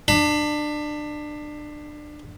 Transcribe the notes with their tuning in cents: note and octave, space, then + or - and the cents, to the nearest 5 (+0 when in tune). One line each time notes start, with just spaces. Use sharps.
D4 +25 B5 +10